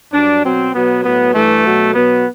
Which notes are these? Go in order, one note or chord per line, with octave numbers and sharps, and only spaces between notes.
G2 F#3 D4
B2 F#3 C4
B2 F#3 B3
A2 F#3 B3
G2 E3 A3
B2 F#3
B2 F#3 B3